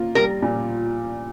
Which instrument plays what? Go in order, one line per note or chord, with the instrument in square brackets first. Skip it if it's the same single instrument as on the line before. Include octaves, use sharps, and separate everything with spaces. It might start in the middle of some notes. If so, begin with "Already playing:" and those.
Already playing: [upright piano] A#3 F4
[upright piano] G3 [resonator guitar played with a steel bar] A#4
[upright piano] A#2